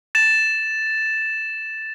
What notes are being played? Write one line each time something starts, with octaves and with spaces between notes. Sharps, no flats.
A6 E7